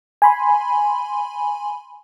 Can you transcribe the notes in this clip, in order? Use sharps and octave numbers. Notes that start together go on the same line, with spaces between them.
G#5 B5 C6